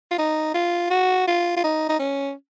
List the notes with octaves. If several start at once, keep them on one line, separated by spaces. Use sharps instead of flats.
F4
D#4
F4
F#4
F4
F4
D#4
D#4
C#4